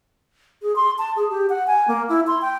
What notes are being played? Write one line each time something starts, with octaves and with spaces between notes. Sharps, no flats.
G#4
C6
A5
G#4
G4
F#5
G#5
A#3
E4
C6
G5